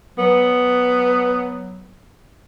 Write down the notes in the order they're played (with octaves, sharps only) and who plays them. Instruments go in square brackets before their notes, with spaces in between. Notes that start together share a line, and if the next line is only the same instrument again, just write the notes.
[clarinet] F#3 [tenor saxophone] B3